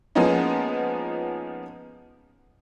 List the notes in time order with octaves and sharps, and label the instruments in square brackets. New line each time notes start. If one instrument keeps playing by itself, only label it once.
[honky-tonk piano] F3 G#3 A#3 B3 C#4 D#4